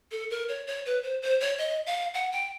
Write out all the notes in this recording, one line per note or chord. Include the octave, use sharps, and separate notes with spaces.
A4
A#4
C#5
C#5
B4
C5
C5
C#5
D#5
F5
F#5
G5